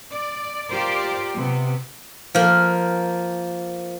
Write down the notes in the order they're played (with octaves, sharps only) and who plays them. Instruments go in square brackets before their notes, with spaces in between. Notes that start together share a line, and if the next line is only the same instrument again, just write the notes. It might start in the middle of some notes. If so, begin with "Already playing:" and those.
[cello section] D5
F4 G4 A#4 C5 D5
C3 B3
[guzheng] F3 A#3